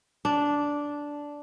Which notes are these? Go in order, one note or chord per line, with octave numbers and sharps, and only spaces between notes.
D4